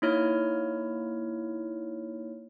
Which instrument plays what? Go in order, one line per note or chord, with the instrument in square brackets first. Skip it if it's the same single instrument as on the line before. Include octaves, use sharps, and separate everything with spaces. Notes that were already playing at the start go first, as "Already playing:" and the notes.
[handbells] A#3 D#4 E4 C#5 F6